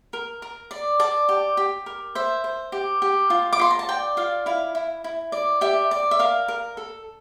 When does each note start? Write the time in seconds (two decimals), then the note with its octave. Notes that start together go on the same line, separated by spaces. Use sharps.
0.13 A#4
0.42 A#4
0.71 D5
0.99 D5 A5
1.29 G4
1.57 G4
1.86 A#4
2.15 C5 E5
2.44 C5
2.72 G4
3.02 G4
3.30 F4
3.53 D6
3.59 F4 C6
3.71 A#5
3.79 A5
3.89 D5 G5
4.17 F4 F5
4.46 E4 F5
4.75 E4
5.04 E4
5.32 D5
5.61 G4 E5
5.91 D5
6.11 E5
6.19 A#4 F5
6.48 A#4
6.77 A4